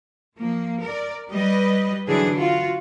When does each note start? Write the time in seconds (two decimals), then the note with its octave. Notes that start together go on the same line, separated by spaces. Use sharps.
0.38 F3 A#3
0.81 A#4 D5
1.30 G3 B4 D#5
2.07 D3 E3 F#3 D4 G#4
2.36 F4 F#4